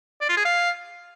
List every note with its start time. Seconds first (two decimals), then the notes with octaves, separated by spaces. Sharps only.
0.21 D5
0.29 F4
0.37 G#4
0.45 F5